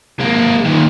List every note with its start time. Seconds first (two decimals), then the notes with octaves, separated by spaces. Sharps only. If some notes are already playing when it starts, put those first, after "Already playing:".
0.19 G#3 A#3
0.64 A#2 D#3